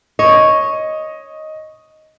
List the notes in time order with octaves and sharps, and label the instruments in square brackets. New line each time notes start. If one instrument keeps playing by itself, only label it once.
[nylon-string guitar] C#5 [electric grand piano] D#5